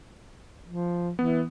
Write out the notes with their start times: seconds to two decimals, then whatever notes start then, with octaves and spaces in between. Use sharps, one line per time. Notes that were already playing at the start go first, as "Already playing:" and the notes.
0.66 F3
1.19 E3 B3